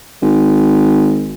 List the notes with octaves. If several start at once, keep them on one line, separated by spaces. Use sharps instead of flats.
G#1